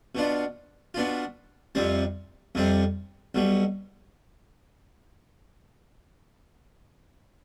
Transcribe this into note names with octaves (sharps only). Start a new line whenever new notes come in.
B2 B3 D4 F4
B2 B3 D4 F4
F2 C3 G3 C4
F2 C3 G3 C4
B1 B2 G3